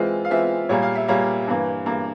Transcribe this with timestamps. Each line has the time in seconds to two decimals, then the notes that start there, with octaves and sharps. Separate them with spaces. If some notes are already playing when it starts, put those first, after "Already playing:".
Already playing: E3 G#3 C4 F4 E5
0.25 F5
0.30 E3 G#3 C4 F4 E5
0.69 A#2 G3 A#3 C#5
0.82 F5
0.95 E5
1.08 A#2 G3 A#3 C#5
1.47 G2 E3 A#3
1.86 G2 E3 A#3